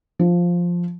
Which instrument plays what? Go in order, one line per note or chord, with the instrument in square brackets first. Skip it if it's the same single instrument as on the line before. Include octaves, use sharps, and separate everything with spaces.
[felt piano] F3